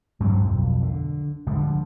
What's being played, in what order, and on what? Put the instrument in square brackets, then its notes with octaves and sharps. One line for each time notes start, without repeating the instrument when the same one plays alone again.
[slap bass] G2 F#3 C4
B1 F2
D3
D3 F3 G3 G#3